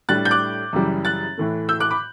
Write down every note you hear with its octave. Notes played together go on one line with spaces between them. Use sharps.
A2 G3 D4 F#6 A6
G6
D6 F#6
F#2 C#3 E3 G3
F#6 A6
A2 E3 A3
E6 G6
D6 F#6
B5 D6